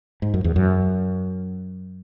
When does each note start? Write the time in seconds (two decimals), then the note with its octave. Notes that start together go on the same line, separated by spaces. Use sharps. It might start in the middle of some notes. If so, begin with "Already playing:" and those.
0.22 G#2
0.34 F#2
0.44 E2
0.56 F#2